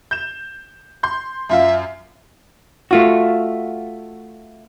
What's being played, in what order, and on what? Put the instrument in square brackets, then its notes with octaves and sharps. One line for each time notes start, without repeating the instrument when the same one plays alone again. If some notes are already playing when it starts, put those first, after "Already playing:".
[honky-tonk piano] G6 E7
C6 G6
[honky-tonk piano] F#2 F4 F5 [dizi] E5
[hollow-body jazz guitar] A3 F4 F#4